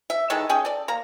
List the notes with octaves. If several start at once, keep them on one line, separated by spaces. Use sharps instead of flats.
E5
D#3 E3 G#3 A4
C#4 G#4 G5
A4 D5
A#3 A#5